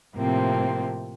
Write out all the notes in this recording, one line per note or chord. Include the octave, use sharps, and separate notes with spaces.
A2 C3 F3 A#3 C4